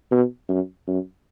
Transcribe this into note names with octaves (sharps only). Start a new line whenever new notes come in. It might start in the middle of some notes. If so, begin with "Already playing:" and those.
B2
F#2
F#2